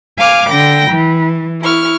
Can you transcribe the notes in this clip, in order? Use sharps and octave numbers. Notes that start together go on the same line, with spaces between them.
F5 G#5 D6 F6
D3 G5 A#6
E3
E4 C#6 F6